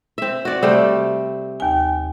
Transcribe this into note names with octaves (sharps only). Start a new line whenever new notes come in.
C4 E5
F#4 D5
C3 G3 A3 C5
D#2 G#5